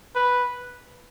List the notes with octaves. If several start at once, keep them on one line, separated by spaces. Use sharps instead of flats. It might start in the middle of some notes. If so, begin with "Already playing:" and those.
B4